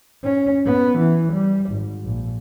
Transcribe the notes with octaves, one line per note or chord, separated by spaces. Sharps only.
C#4
B3
E3
G3
G#1
A#1